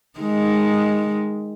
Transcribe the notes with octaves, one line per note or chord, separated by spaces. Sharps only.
D#3 G#3